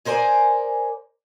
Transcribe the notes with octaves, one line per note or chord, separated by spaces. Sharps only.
G#4 A#4 C5 D5 G#5